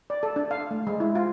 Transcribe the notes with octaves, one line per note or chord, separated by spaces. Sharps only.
D5
A4
D4
F5
A3
G#3
E4
F4